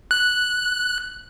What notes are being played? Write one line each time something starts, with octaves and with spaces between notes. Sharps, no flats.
F#6